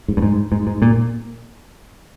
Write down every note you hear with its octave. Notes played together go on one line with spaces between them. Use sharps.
G#2
G2
G#2
G#2
G#2
A#2